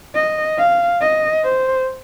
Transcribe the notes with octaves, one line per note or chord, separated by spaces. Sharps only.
D#5
F5
D#5
C5